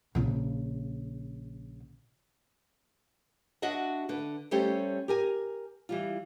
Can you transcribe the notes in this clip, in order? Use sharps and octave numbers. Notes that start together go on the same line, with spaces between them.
A#1 C#3
D4 F#4 D#5 E5 F#5
D3 B4
G3 A3 C#4 G4 A4 C5
G4 A#4 G#5
E3 G3 F4